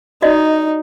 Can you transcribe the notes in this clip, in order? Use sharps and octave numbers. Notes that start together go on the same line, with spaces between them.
D#4 F#4 D5 D#5